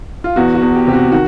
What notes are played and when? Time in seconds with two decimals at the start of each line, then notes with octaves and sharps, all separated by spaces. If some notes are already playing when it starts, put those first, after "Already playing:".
0.24 F4
0.36 E2 F#4
0.55 F#4
0.62 E2
0.75 G4
0.87 C3 G4
0.93 F#4
1.12 D#3 F#4